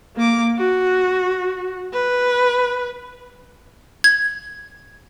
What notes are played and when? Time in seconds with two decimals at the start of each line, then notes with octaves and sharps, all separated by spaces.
0.16 A#3 D6
0.58 F#4
1.94 B4
4.04 G#6